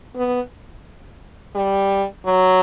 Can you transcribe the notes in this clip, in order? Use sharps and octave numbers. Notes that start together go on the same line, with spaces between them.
B3
G3
F#3